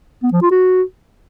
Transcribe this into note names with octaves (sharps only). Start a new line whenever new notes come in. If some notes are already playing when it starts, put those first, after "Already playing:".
B3
F3
F4
F#4